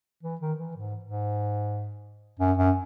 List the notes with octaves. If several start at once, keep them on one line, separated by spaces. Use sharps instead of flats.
E3
D#3
E3
G#2
G#2
F#2
F#2